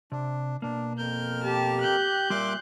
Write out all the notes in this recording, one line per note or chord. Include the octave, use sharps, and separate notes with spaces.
C3 D4
B2 A#3 D4
F2 A#4 F6 G6
G4 A5
F#6 G6
A#2 G3 A#3 E5 C6 D6